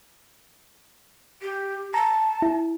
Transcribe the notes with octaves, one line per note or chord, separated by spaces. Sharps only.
G4
A5 A#5
E4